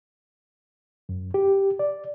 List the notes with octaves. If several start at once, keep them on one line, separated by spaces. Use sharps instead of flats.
F#2
G4
D5